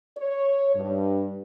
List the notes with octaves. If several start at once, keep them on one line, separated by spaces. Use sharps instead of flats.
C#5
G2